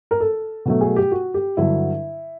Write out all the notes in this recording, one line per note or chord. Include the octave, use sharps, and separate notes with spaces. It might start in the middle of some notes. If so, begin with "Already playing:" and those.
A#4
A4
B2 F#3 A3
G#4
G4
F#4
G4
G2 D3 F#3 E4